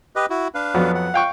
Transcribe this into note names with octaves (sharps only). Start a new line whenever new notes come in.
G4 B4 D#5
E4 F#4
D4 B4 F5
F2 F#3 B3
F#5
F5 G5 C#6